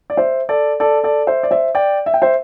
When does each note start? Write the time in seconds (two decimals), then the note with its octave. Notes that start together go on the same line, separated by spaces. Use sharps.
0.10 D5
0.17 C5 E5
0.49 A4 D5
0.80 A4 D5
1.03 A4 D5
1.27 C5 E5
1.43 D5
1.51 C5 E5
1.75 D5 G5
2.06 E5
2.14 G5
2.22 C5 E5